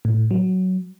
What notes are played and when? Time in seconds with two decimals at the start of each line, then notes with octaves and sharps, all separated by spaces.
0.05 A2
0.31 F#3